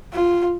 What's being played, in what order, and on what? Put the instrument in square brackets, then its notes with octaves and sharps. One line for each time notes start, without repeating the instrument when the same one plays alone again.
[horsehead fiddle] F4